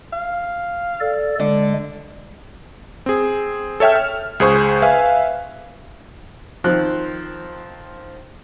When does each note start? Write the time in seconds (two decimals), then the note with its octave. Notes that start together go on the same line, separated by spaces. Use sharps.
0.13 F5
1.00 A4 D5
1.40 D3 G#3 D5
3.06 C4 G#4
3.80 A4 C#5 E5 G5 F6
3.96 F6
4.40 C#2 G#4 C5 C#6
4.82 B4 E5 F5 G#5
6.64 D#3 F3 C4 F#6